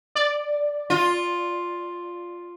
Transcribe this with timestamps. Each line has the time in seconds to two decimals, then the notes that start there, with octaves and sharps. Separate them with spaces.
0.15 D5
0.90 F4